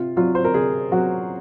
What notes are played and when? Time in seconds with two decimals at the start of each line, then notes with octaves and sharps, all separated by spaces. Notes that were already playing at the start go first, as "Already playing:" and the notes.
Already playing: C3 F4
0.17 F#3 F4
0.35 C5
0.45 A#4
0.54 C3 G#4
0.92 F#3 F#4